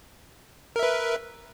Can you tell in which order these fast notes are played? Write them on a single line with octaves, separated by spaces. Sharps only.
A#4 E5 B4